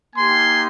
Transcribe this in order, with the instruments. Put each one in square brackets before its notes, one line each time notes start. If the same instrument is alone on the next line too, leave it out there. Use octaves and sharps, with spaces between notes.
[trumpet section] A#3 D#4 G4 G#5 C6